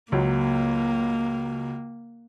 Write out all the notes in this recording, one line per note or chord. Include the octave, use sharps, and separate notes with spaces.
C#2 F#3 A#3